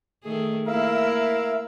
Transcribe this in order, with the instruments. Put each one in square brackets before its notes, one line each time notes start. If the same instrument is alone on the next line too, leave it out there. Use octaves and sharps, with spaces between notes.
[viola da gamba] D#3 A3 G#4
[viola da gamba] A#3 E4 [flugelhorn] A#4 [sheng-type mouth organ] E5 F5